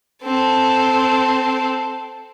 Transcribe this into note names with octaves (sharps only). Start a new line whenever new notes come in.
C4 A4